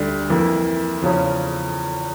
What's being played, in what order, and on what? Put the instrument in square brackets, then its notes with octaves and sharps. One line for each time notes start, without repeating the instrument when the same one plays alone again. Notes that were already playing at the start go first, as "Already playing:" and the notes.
Already playing: [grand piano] D2 D3 G3 D4
F2 E3 A#3 E4
E2 C#3 F3 C#4